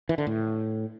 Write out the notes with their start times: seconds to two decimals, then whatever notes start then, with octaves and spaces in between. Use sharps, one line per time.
0.09 E3
0.18 D3
0.27 A2